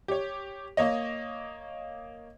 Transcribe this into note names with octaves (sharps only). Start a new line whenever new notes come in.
G4 C#5
A#3 C#5 D#5